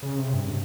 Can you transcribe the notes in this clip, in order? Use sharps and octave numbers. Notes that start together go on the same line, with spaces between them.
C#3
C3
G2